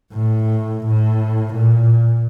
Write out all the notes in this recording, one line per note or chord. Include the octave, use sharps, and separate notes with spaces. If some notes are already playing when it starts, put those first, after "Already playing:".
A2
A2
A#2